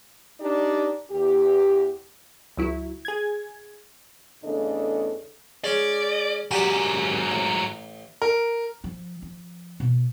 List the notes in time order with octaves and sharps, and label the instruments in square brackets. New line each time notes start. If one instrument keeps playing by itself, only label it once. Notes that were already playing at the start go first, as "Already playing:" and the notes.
[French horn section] D4 D#4 G4 D5
E2 G4
[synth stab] C#2 F#3 E4
G#4 G#6
[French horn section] E2 C#3 A3 D4 A4 D#5
[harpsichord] G#3 C#4 [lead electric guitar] D5
[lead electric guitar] G#2 F#3 [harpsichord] F#4 G4 D5
[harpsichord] A1
[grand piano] A#4
[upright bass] F3
F3
B2